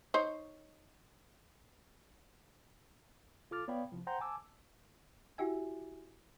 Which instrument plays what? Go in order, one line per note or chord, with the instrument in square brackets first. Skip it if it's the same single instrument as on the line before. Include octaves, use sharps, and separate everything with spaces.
[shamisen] D#4 C5 C#5
[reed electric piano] C2 F4 A4 D6 F6 A6
B3 C#5 D5 F5 G5 B5
C2 F3
C5 F#5 G5 A#5 C6 G6
G#5 A5 D6 E6
[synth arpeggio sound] E4 F#4 G4 E5 G#5